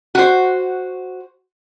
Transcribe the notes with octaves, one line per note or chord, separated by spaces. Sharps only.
F#4 C5